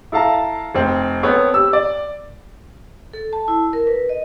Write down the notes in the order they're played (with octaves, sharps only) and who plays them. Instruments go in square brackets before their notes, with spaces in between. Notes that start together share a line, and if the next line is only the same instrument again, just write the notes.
[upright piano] E4 A4 F5 A5 A#5
F1 C4
B3 C4 A4 C#5
G4 E6
D5
[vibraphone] A4
A5
E4
A#4
B4
D#5